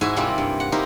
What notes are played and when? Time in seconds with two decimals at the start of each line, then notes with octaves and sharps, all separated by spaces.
0.01 G#2 E4 F#4 E5 G#5
0.16 C3 G3 A#3 C4 E4 F4
0.38 G2
0.60 F#5
0.72 D#4 E4 G4 A#4 C5